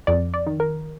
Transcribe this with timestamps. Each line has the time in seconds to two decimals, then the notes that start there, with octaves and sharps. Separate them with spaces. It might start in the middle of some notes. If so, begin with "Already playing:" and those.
0.07 F2 D5
0.34 D5
0.47 D#3
0.60 A#4